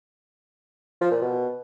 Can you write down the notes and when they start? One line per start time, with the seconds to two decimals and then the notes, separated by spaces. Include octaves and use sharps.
1.01 F3
1.11 A#2
1.22 B2